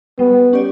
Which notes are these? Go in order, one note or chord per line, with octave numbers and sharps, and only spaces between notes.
G3 B3
C#4 G4 D5